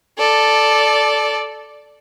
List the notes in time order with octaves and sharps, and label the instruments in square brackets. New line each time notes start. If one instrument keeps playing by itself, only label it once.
[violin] A4 D5